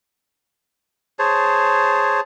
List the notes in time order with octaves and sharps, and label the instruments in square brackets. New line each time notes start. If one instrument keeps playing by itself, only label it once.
[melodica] G#4 C5 C#5 A5